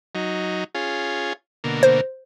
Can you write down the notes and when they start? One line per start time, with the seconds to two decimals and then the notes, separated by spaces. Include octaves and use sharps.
0.15 F#3 D#4
0.75 C#4 F4 G#4
1.64 B2 D3 A#3
1.83 C5